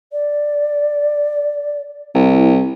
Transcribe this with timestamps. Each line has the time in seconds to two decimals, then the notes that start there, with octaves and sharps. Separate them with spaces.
0.12 D5
2.15 C2 E4